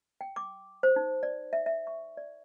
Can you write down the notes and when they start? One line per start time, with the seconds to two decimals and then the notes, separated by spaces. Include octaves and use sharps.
0.21 G5
0.36 D6
0.83 C5
0.96 D#4
1.23 D5
1.53 E5
1.66 E5
1.87 C#6
2.17 D5